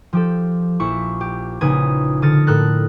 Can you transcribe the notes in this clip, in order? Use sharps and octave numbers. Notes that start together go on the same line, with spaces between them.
F3 G4 A4
A#1 E4 E5 C#6
G4
A#1 C#3 D#4 B4 D#6 G#6
D3 D#6 F6 A6 A#6 C#7
A2 A4 A#4 F#6 A6